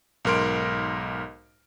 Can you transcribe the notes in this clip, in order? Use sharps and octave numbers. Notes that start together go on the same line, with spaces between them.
B1 G#2 A#4 C6 D7